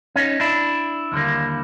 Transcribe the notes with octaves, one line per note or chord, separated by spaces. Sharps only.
C#4 D#4
D4 E4
D#2 D3 G3 A#3